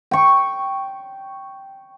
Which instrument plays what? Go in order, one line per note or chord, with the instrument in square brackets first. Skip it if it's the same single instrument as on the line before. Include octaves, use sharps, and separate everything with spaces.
[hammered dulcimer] G5 C#6